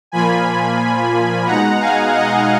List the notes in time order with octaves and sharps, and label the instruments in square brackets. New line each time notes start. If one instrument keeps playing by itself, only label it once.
[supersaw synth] A#2 F3 A#3 F4 G#5 B5
B2 G#3 D#4 F#5 A#5
F5 G#5
D#5 F#5